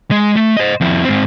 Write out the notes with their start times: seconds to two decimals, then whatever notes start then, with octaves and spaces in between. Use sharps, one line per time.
0.11 G#3
0.36 A3
0.57 C5 D#5
0.81 F2 E4
1.04 G#2 C4